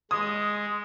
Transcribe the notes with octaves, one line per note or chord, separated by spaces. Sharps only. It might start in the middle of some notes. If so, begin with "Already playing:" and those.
G#3 D#6